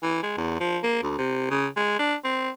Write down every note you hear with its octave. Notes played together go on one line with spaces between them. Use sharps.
E3
G#3
E2
F3
A#3
D2
C3
C#3
G#3
D4
C4